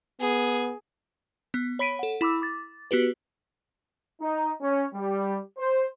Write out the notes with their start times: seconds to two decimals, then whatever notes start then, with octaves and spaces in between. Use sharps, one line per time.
0.21 B3 G#4
1.54 B3
1.79 C#5 B5 B6 D7 D#7
1.99 A4 F#5
2.21 E4 B5 D6 E6
2.42 D6 A6
2.91 B3 F#4 G4 B4
4.21 D#4
4.61 C#4
4.94 G3
5.58 C5